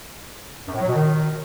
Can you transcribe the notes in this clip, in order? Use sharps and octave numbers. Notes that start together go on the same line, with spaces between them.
F#2
A2
F#3
B2
D#3